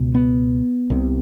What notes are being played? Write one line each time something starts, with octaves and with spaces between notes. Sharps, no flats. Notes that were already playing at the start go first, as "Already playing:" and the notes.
Already playing: C#2 B2
B3
C2 C3